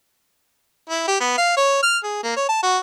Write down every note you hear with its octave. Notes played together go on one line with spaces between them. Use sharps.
E4
G4
B3
F5
C#5
F6
G#4
A#3
C#5
A5
F#4